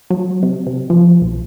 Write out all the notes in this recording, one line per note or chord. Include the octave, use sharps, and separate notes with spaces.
F#3
C3
C3
F3
B1